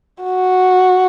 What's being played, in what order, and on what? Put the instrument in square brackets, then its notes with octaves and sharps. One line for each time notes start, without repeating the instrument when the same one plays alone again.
[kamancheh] F#4